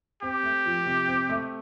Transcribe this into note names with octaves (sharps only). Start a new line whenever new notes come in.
C4 G4
A3
F3
C3
C4
A3